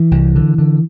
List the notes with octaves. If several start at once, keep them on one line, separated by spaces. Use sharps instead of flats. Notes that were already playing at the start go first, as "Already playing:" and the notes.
Already playing: E3
C2
D3
D3